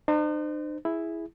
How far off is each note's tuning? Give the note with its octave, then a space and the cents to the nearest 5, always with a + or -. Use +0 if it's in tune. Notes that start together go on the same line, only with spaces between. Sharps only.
D#4 -45 C5 -25
E4 +0 G#4 +0